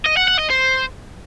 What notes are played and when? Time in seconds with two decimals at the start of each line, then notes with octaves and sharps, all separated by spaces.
0.06 D#5
0.17 F#5
0.28 F#5
0.39 D#5
0.50 C5